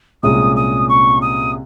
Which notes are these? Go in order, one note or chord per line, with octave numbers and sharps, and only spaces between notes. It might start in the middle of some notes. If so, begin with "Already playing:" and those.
C2 A#2 G#3 C#4 G#4 D#6
D#6
C#6
D#6